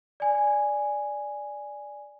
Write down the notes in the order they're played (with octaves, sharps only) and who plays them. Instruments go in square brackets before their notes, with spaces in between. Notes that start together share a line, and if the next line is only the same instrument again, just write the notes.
[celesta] D5 G#5